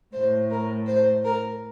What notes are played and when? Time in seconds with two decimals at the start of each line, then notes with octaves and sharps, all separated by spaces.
0.13 A2 C5
0.51 A#4
0.87 C5
1.25 A#4